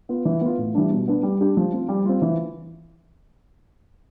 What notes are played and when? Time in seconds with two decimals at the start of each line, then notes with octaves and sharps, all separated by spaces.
0.09 B3 F4
0.25 E3
0.41 B3 F4
0.58 A2
0.74 E3 G3 D4
0.91 B2
1.08 B3 D4
1.23 G3
1.40 D4 G4
1.57 F3
1.73 C4 F4
1.88 G3
2.05 C4 F4
2.22 E3